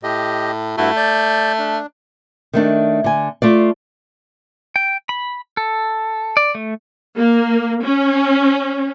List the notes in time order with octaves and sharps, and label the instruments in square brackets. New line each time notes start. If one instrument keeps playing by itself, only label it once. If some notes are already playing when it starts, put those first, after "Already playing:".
[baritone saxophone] A2 [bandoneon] G4 D#5
[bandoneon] G2 E4 F#4 [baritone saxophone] A3
[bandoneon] D5 G6
D4
[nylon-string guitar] D#3 A3 D4
D3 G#5
A3 F4 D5
[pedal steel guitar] G5
B5
A4
D5
A3
[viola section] A#3
C#4